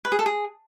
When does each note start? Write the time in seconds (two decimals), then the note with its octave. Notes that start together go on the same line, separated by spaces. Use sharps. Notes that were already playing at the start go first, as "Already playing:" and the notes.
0.05 B4
0.12 G#4
0.19 A4
0.26 G#4